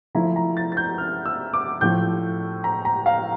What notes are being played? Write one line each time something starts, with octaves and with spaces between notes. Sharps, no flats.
F3 A3 E4 A#5
A#5
A6
A6
G6
F6
E6
D6
A2 F3 A3 G6
A#5
A#5
F5